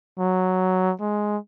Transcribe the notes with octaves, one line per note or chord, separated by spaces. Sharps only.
F#3
G#3